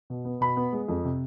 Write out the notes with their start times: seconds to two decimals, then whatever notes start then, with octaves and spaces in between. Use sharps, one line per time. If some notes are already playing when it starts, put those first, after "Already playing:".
0.10 B2
0.25 B3
0.41 B2 B5
0.57 B3
0.73 G#3
0.88 F2
1.04 C3